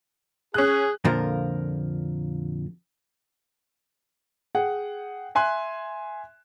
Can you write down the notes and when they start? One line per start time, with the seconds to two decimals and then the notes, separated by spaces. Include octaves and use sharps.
0.54 C#4 G#4 F#6
1.04 F2 A#2 D3 F3 A#4
4.55 G#4 F#5 G5
5.35 E5 G#5 C6 F#6